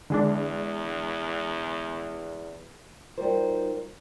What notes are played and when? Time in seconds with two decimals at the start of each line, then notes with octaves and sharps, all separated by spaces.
0.10 E2 D3 G#3 D4
3.18 G3 D#4 F4 F#4 A#4 C5